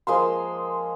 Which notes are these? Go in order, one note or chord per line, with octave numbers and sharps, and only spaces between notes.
F3 G#3 A#3 C6